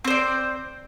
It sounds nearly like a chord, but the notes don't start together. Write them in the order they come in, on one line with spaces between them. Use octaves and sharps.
C4 C5 D5